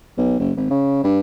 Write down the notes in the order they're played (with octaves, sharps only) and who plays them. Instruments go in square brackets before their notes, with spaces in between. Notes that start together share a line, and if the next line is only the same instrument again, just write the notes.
[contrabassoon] B1
F#1
G#1
C#3
G2